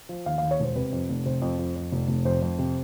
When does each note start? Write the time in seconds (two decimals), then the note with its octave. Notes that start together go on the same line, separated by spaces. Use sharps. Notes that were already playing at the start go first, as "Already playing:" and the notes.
0.09 F3
0.26 D#2 F5
0.38 D#2 F5
0.51 C#5
0.60 E1 C5
0.76 C3 B4
0.93 F2
1.09 F1
1.25 C3 C5
1.42 F2
1.59 F2
1.76 F2
1.92 F1
2.08 F1
2.25 F2 C5
2.42 F2
2.59 C3